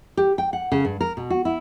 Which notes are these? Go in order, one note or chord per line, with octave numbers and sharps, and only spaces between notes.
G4
G5
F#5
C#3
G2
A#4
B2
F#4
E4